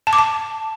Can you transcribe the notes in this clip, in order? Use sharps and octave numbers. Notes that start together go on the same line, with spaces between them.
A5
D6
A5